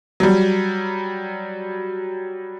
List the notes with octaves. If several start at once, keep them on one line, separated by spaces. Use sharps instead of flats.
F#3 G3